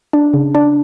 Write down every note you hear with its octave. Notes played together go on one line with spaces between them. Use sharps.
D4
C#3
D4